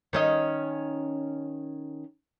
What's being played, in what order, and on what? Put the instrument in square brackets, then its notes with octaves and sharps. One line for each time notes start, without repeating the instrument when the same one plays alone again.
[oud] D#3 C#4 D#5